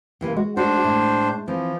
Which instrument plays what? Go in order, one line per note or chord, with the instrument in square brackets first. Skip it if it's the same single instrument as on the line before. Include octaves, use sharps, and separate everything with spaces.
[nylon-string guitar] C3 E3 A#3
[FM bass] G#3 [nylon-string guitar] F#4
[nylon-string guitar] A3 D#4 F#4 [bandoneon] D4 C5
[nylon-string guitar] A2
[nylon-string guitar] E3 C4 [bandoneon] F3